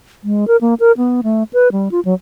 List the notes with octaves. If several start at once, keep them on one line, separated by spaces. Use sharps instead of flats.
G#3
A#4
A#3
A#4
B3
A3
B4
G3
F4
F#3